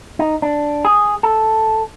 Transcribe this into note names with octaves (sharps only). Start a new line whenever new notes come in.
D#4
D4
G#4
A4